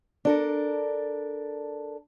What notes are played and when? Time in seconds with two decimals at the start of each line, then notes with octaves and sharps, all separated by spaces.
0.25 D4 A4 A#4